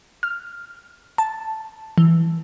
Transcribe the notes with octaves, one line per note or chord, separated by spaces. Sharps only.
F6
A5
E3